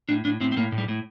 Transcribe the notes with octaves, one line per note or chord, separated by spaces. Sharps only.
A2 D4
A2 D4
A2 C4
C4
A2 A#3
A2
G3
A2